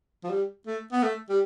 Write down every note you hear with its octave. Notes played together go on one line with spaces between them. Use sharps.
F3
G3
A3
B3
A3
G3